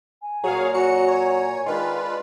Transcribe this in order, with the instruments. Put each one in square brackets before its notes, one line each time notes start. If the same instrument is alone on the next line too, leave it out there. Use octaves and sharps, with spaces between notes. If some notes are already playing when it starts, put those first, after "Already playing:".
[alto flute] G#5
[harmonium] A#2 A#5 [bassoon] F#3 [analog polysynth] G#4 C#5 F5
[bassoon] F#3 [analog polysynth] F#4 C#7 [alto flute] G#5
[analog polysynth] C#5
[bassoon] D#3 [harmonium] G#3 D4 D5 [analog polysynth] F4 B4